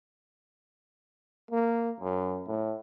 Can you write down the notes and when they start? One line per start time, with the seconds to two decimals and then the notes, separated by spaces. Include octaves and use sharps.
1.51 A#3
2.00 F#2
2.47 A2